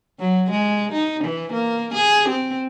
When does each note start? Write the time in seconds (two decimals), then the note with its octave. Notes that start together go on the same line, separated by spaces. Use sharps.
0.20 F#3
0.51 G#3
0.92 D#4
1.24 E3
1.53 A#3
1.94 G#4
2.29 C4